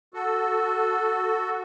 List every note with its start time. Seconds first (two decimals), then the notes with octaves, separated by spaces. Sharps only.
0.14 F#4 A4